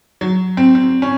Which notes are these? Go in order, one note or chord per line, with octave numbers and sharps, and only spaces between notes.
F#3
C4
C4
C#4